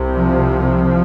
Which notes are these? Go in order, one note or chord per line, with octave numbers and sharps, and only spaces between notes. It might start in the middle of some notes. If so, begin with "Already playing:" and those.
Already playing: C2 C3
F3